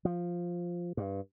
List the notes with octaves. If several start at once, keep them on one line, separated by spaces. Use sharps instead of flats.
F3
G2